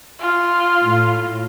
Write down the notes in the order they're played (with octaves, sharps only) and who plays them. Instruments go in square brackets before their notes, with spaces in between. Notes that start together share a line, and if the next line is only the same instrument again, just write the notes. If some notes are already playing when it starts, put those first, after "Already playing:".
[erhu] F4
[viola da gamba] A2